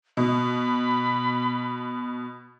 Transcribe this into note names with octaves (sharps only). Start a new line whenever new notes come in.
B2 B5